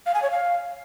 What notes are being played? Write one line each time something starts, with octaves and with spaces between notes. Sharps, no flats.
F5
G#5
C#5
F5